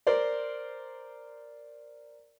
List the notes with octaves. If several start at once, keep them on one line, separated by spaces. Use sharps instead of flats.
A#4 C5 D5